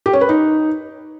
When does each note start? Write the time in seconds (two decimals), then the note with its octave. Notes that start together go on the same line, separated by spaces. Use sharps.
0.06 G4
0.13 C#4
0.21 B4
0.29 D#4